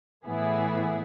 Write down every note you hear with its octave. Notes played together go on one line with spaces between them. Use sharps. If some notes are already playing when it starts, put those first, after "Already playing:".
A2 E3 B3 E4 G#4